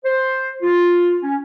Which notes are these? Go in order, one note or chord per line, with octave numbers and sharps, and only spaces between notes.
C5
F4
C#4